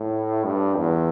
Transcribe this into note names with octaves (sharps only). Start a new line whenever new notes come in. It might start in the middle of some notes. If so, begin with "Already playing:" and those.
Already playing: A2
G2
E2